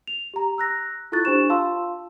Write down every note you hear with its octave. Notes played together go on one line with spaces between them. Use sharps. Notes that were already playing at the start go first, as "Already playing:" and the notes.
F7
G4 A#5
E6 F#6 A#6
E4 F4 A4 C#6 F#6 A6
D4 G4 C5 C#6 E7
F4 F5 A5 C6 E6